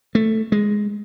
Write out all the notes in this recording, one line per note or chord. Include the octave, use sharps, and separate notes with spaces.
A3
G#3